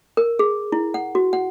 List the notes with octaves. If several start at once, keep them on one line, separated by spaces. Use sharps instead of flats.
A#4
G#4
E4
F#5
F#4
F#5